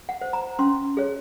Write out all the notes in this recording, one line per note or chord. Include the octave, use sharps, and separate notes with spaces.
F#5
C5
A#5
C#4 C6
G#4 C#5